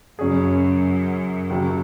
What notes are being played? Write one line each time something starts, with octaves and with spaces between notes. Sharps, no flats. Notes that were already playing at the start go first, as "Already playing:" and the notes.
F#2 C#3 F#3 C#4 G#4
D#2 C#3 F#3